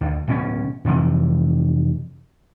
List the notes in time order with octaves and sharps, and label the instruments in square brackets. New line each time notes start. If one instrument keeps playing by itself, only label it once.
[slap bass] D2
D1 B2 C4 C#4
F2 C3 E3